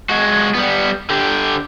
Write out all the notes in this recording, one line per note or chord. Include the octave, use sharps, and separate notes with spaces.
G#3 F#4
G3 B3
D3 G4